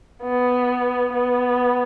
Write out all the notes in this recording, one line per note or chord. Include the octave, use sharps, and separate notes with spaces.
B3
B3